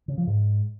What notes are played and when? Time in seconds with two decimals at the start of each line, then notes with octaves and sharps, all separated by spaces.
0.08 C#3
0.18 F3
0.27 G#2